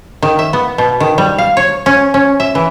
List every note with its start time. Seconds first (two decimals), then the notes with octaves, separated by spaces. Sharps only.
0.22 D#3
0.39 E5
0.53 B3
0.78 B2
1.00 D#3
1.18 G3
1.38 F5
1.57 C#5
1.86 C#4
2.14 C#4
2.40 E5
2.55 E3